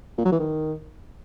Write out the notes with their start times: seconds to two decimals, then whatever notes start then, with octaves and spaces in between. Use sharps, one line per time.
0.18 A#2
0.25 F#3
0.32 E3
0.40 D#3